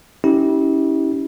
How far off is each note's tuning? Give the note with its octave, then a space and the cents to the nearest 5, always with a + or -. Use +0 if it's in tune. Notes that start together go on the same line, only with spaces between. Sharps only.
C#4 +0 E4 -35 G4 -5